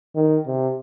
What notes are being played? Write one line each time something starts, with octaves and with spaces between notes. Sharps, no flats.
D#3
C3